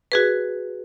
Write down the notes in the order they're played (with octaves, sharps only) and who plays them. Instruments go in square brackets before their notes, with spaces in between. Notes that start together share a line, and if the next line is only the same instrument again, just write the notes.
[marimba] F#4 G#4 B4